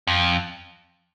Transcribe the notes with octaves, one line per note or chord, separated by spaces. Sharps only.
F2